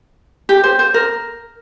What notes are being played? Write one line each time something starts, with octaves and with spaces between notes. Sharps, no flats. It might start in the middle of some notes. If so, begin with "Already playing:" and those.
G4
C5
C5
A#4